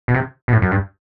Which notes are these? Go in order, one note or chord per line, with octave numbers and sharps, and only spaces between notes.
B2
C3
B2
A2
F#2
G2